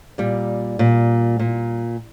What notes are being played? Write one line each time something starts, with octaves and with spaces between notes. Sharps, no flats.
A#2 G3
A#2
A#2